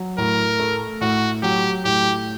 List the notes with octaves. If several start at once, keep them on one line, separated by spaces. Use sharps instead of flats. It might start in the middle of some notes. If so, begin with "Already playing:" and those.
Already playing: F#3
A2 A#4
A3
A2 F#4
F#3 G4
A2 G4